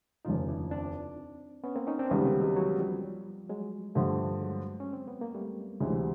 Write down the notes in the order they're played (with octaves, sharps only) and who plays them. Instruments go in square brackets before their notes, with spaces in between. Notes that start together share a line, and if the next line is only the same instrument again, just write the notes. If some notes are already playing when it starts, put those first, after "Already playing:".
[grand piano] F1 D#2 C#3 [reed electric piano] D#4 F4
[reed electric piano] D4 E4
C4 D4
B3 C#4
A#3 C4
C#4 D#4
C4 D4
[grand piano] C#2 C3 D#3 G3 [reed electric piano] B3 C#4
[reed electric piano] A#3 C4
F#3 G#3
E3 F#3
F3 G3
F#3 G#3
[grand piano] G2 D3 F3 [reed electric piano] G3 A3
[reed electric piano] F#3 G#3
C#4
C4
B3
A#3
G3 A3
[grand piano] D2 C3 E3 [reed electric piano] F#3 G#3